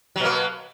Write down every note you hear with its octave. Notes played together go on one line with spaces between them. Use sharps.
B2 F#3 A#3